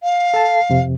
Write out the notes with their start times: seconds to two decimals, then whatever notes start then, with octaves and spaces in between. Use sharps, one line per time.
0.03 F5
0.34 A4 A5
0.70 F2 C3